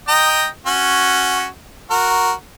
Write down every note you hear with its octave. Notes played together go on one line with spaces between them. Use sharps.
D#5 G5 A#5
C#4 F#4
F#4 A#4